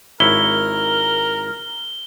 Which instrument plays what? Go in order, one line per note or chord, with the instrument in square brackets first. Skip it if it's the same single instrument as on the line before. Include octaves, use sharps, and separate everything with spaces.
[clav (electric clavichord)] G#1 E4 C#5 [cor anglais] A#4 [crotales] G7